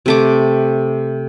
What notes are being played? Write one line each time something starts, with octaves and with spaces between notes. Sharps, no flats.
C3 A3 D6